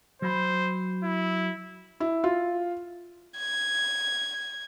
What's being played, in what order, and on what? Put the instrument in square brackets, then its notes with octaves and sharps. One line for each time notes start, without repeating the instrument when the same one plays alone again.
[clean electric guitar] F#3 B5 [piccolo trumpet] C5
[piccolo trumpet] E4
[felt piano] E4
F4
[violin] G#6